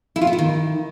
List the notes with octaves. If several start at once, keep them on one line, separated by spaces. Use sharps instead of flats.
E4
F4
B3
E4
D#3